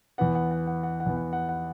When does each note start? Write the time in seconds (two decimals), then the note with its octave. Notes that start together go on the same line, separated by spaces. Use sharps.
0.18 E2 E3 B3 F#5
0.35 F#5
0.51 F#5
0.67 F#5
0.83 F#5
1.00 F#5
1.06 E2 E3 B3
1.17 F#5
1.33 F#5
1.49 F#5